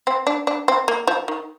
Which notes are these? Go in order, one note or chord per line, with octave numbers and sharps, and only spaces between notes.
C4
D4
D4
C4
A#3
F3
D#3